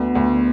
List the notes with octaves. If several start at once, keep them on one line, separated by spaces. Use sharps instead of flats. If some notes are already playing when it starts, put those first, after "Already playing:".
Already playing: D2 B3
D2